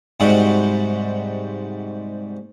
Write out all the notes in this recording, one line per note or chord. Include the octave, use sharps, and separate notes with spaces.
G#2 C3 G3 F#4